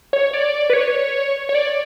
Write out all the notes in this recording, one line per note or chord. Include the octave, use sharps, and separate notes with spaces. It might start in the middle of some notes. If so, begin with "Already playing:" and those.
C#5
D5
B4
C#5
C#5
D5